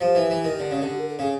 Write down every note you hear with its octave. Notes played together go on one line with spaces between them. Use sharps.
F3 G4
E3
E3
D#3
D3
C#3
D3
A#4
A4
C#3 G#4